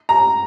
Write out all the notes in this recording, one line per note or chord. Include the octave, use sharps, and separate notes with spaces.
A#5